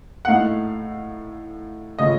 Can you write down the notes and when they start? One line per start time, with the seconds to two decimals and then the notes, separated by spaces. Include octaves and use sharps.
0.25 F#5
0.28 A2 A3 D#4 F5
1.99 C#3 A3 C#4 F4 D#5